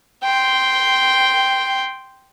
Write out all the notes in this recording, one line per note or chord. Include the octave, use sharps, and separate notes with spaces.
G5 C6